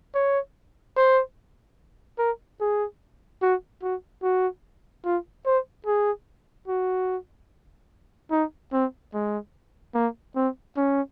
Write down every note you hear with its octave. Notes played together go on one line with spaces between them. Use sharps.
C#5
C5
A#4
G#4
F#4
F#4
F#4
F4
C5
G#4
F#4
D#4
C4
G#3
A#3
C4
C#4